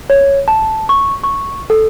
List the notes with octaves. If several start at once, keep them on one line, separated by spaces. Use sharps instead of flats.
C#5
A5
C#6
C#6
A4